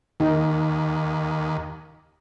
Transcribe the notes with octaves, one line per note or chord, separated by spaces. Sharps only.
D#2 D#3 D#4